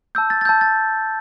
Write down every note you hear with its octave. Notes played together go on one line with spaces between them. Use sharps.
A5 E6 G6
A6
A6
A5 E6 G6
A6